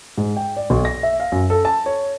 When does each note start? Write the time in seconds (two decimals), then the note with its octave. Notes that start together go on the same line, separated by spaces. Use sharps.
0.18 G#2
0.37 G5
0.57 D5
0.70 B1
0.85 A#6
1.03 E5
1.20 F5
1.32 F#2
1.50 A4
1.65 A5
1.86 C#5